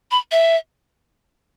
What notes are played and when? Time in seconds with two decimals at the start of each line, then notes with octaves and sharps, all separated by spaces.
0.11 B5
0.31 E5